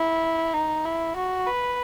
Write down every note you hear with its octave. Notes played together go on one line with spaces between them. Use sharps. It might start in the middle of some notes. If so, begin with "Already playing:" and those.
Already playing: E4
D#4
E4
F#4
B4